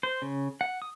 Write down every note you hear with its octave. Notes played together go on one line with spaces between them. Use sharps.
C5
C#3
F#5
D#6